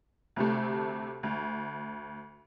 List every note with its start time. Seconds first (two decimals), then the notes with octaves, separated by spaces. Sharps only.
0.36 D2 C3 A3
1.23 D2